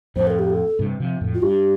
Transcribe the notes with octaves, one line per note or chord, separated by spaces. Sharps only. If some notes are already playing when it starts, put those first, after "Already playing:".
F2 A2 C5
A4
G4
A4
G2 C3
C3 F3
F2 A2
F4
G2 G4